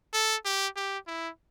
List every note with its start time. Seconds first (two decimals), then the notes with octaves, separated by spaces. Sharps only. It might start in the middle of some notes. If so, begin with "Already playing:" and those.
0.13 A4
0.45 G4
0.76 G4
1.07 E4